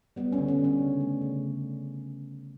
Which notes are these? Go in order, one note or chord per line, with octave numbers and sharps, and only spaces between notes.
G3 B3
C#4
D3
C#4
G3
C#4
C#3
A3
C#3